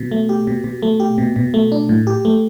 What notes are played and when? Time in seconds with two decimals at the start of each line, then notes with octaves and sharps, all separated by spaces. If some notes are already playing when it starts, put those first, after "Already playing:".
Already playing: B2
0.11 A3
0.29 G4
0.47 B2
0.64 B2
0.82 A3
1.00 G4
1.18 B2
1.36 B2
1.54 A3
1.72 D4
1.89 A2
2.07 G4
2.25 A3